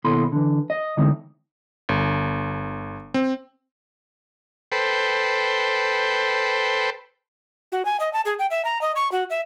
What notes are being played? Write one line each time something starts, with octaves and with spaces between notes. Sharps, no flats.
D#2 B2 E4 A4 B5 C6
D3 E3
D#5
D3 E3 G#3 C4 D#4
G1
C4
A4 B4 C5 G5
F#4
G#5
D#5
A5
G#4
G5
E5
A#5
D#5
C#6
F#4
E5